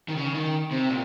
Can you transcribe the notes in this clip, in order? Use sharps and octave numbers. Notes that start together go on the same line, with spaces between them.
D#3
C#3
D#3
C3
A#2